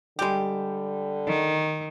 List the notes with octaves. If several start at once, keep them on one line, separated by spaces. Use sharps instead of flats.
D3 G3 G#3 G4 G5
D#3